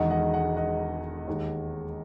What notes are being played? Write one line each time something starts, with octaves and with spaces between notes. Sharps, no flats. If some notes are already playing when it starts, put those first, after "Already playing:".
Already playing: E1 E2 D#3 G#3 D#5 F#5
D#5 F#5
D#5 F#5
D#5 F#5
D#2 D#3 G#3